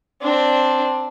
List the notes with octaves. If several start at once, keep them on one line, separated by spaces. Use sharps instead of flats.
C4 D4